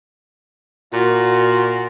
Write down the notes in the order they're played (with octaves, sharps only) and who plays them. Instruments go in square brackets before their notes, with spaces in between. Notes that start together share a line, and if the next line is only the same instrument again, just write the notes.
[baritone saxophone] A#2 [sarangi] F#4